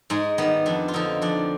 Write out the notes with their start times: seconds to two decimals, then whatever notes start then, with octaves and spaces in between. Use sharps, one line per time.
0.10 G#2 G#3
0.38 D#3 G3 B3
0.66 F2 D4
0.88 F4
0.94 D3 F3 D#4
1.22 F2 D4